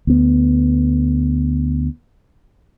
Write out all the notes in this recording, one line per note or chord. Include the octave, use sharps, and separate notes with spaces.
D2 B3